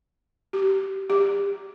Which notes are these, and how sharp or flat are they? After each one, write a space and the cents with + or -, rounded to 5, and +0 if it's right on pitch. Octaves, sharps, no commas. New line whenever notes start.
G4 -20
G4 +30